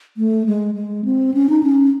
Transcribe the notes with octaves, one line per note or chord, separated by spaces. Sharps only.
A3
G#3
G#3
C4
C#4
D#4
C#4